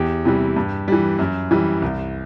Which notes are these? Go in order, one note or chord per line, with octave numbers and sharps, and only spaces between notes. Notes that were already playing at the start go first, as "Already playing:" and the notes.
Already playing: E2 G4
C3 E3 G3
G2
E3 G3
F#2
E3 G3
C2